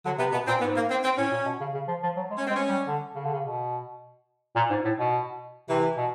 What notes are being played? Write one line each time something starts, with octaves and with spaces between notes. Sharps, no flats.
D3 F#3
C3 B3
B2 B3
A#2 C4
G#2 B3
A#3
C4
C4
A2 C#4
A#2
B2
C#3
C#3
F3
F3
F#3
G#3
C#4
G#3 C4
C#4
G3
D3
C#3
D3
C#3
B2
A#2
G#2
A2
B2
C3 E3
B2